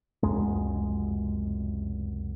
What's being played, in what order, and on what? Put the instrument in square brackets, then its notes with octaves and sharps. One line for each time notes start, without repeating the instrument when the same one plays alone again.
[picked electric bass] F1 C#2 F#2 G#3